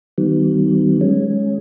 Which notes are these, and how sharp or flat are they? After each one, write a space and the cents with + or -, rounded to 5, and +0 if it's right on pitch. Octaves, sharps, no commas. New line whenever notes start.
D#3 +0 G3 -40 B3 +30
G#3 +5 C#4 +0